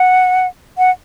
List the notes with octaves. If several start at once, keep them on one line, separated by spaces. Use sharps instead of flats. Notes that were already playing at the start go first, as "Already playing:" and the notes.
Already playing: F#5
F#5